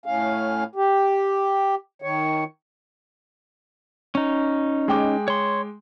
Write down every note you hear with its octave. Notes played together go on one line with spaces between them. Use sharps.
A2 C#4 F5
G4
D#3 C#5
C#4 D#4
G#3 G5 D6
C#5 C6